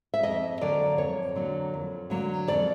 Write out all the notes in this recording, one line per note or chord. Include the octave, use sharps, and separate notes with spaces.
E5
F2 D#5
D3 F#3 A#3 D5
F2 C#5
D3 F#3 A#3
F2
D3 F#3 A#3
F2 D5